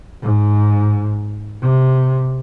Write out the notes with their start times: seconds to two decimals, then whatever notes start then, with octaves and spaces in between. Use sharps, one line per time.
0.23 G#2
1.62 C3